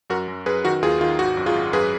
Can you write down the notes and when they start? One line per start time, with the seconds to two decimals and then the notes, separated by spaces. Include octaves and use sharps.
0.10 F#2 F#4 A#4
0.28 F#2
0.46 F#2 G#4 B4
0.64 D#3 F#4 A#4
0.82 D#2 F4 G#4
1.01 D#3 F4
1.19 G#1 F#4
1.37 F#2
1.46 F4 G#4
1.55 G#1
1.73 F#2 G#4 B4